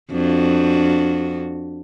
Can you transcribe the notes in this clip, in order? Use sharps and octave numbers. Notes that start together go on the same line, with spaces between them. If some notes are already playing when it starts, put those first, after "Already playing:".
F2 D4 F#4